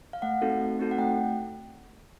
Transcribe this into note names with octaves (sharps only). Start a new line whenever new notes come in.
F5
A3 F#5
C4 D#4 F#4 A4
A3
C4 D#4 F#4 A4
F#5
A3 G5